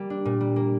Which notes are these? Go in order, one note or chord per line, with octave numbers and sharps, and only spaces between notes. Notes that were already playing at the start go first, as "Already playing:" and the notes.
Already playing: G3 A#3
D4
A#2
G3
A#3